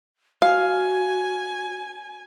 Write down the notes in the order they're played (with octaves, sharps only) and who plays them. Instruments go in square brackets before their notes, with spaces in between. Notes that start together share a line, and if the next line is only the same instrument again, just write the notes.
[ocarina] F#4 [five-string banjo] F5 [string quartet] G#5